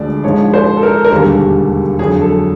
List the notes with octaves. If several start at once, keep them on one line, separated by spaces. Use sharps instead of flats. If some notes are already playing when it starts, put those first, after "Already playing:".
Already playing: D2 D3 F3 G#3 D5
A#1 G#2 F3 G#3 C#5
C5
A4
A#4
A#4
E1 D#2 D3 G3 A4
F2 D3 F#3 G#4
A4